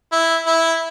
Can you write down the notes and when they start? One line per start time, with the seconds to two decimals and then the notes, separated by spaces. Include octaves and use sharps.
0.12 E4
0.47 E4